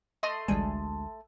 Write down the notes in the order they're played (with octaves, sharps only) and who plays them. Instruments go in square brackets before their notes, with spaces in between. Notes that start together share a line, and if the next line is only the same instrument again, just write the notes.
[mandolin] A3 C6 D#6 [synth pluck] D#5 A#6
[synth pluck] A1 G3 G#5 [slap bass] D2 G#3